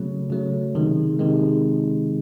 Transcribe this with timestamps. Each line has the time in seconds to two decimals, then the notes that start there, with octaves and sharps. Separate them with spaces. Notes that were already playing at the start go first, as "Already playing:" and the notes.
Already playing: C#3 F#3 A3
0.30 C#3 F#3 A3
0.75 C3 D#3 G#3
1.19 C3 D#3 G#3